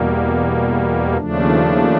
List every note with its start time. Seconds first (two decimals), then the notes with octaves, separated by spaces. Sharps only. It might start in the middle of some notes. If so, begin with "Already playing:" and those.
Already playing: E2 B2 G3 A#3
1.17 D#2 C#3 F3 A3 D4